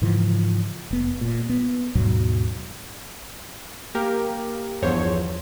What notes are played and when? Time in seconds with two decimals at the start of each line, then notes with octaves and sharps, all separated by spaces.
0.02 G#2 C#3 E3 F3
0.91 F1 B3
1.21 A#2
1.49 B3
1.95 D#2 G#2 B2 F#3
3.95 A#3 G4 A#4
4.82 G1 E2 F3 C5 C#5